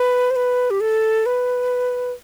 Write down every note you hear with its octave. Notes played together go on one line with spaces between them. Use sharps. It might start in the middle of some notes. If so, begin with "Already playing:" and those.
Already playing: B4
C5
B4
G4
A4
B4